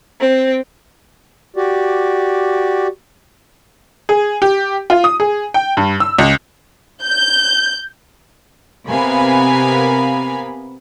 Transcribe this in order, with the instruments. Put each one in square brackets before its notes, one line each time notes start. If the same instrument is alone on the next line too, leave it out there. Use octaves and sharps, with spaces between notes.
[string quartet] C4
[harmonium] F#4 G4 D5
[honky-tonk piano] G#4
G4
F4
D#6
G#4
G5
G2
E6
C#2
[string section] G6
C3 B3 A#4 F5 G#5 B5